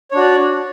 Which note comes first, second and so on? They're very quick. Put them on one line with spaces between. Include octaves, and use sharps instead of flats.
C#5 D4 F#4 D5